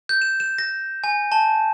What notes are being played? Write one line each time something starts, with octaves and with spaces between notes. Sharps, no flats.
G6
E7
E7
A#6
G#5
A5